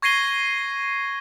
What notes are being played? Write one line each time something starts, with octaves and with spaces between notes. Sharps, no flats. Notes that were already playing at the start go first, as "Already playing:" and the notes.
C#6 G#6 A#6 C7 D#7 G7